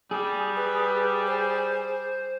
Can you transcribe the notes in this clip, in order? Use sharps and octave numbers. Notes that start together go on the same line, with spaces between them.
G3 G#4
B4
C5